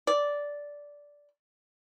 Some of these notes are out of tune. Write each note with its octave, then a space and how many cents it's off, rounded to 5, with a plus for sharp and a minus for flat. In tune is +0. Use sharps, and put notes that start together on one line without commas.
D5 -10